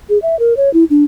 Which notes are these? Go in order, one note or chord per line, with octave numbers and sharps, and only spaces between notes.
G#4
E5
A#4
C#5
E4
D4